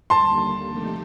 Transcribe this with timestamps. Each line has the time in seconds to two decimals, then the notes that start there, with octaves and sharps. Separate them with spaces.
0.10 D#2 D3 G3 A#3 A5 C6
0.68 C3 F3 A3 D#4 G4